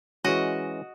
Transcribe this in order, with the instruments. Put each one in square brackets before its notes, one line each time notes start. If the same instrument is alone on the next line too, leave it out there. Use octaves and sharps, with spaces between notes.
[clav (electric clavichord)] E3 G#3 C#4 [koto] F#4 D#5